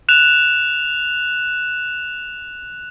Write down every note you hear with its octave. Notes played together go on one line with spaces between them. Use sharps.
F#6 E7 F7